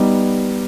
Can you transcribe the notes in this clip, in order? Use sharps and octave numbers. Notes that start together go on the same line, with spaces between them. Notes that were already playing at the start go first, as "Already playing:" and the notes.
Already playing: G3 B3 D#4